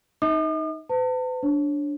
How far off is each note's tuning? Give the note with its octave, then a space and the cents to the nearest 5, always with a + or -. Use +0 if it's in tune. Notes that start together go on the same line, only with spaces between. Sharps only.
D#4 +0 D#5 +45 D#6 -45
B4 +45 A5 +40
D4 -10 C#5 -25